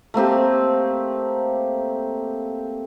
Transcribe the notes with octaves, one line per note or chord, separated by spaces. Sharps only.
A3 A#3 C4 G4